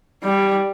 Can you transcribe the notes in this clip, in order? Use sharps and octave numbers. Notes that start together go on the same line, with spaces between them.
G3